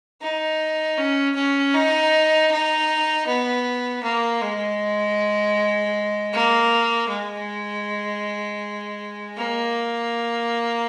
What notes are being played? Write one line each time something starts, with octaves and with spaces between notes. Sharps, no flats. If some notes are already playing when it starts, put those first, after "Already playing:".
D#4
C#4
C#4
D#4
D#4
B3
A#3
G#3
A#3
G#3
A#3